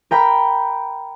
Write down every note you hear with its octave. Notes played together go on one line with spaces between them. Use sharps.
A#4 G5 B5